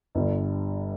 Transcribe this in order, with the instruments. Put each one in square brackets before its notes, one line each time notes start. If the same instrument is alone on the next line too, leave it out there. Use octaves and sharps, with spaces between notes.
[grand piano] G1 G2 D3